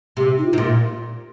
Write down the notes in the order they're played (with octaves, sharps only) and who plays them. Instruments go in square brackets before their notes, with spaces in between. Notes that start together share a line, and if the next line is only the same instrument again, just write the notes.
[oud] C3 [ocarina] G4
[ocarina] D#4
F4
[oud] C3
A#2